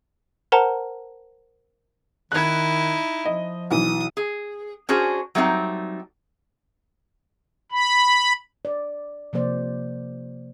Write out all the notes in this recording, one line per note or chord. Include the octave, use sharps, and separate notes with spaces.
A#4 C5 F#5 A5 A#5
D#3 D#4 E4 F#6 G#6
F3 D#5
B1 E3 D#6
G#4
C#4 D4 F#4 G#4 C5
F#3 G3 A3 C4 C#4 D#4
B5
D5
C3 F3 A#3 C5 D5